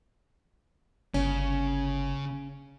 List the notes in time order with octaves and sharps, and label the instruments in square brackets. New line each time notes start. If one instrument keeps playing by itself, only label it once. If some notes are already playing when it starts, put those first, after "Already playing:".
[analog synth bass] G1 [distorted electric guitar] C#3 [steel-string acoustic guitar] C#4